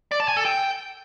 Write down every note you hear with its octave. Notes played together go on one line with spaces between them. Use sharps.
D5
A5
G#5
A4
G5